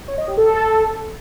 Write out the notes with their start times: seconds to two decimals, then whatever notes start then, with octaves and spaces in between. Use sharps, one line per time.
0.08 C#5
0.18 D#5
0.28 G4
0.37 A4